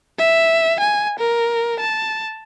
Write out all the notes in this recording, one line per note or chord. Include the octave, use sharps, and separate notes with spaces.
E5
G#5
A#4
A5